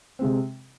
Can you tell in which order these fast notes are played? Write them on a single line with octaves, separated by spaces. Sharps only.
C4 G#3 C3